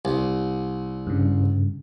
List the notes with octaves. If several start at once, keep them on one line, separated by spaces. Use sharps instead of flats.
C2
G2 C#3